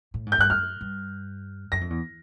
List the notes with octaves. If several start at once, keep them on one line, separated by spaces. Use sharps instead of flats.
A2
G#2
G6
G2 F#6
F#2 F6
G2
F#2 A#6
F2
E2